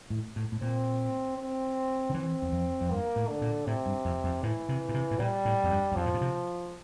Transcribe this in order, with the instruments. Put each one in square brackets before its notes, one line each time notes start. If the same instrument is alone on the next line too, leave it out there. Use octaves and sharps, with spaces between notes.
[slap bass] A2
A2
A2
[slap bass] A#2 [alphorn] C4
[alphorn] C4
[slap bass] D3
[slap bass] E3 [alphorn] C4
[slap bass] E2
F2
F2
[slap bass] G2 [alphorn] A#3
[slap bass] A2
[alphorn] D3
[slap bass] A#2
[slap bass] A2 [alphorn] C3
[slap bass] G2
F2
F2
[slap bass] A2 [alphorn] E3
[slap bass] C3
A#2
C3
A2
[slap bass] A#2 [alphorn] G3
[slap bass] A2
F2
G2
E2
[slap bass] F2 [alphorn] F3
[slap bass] A2
A#2
C3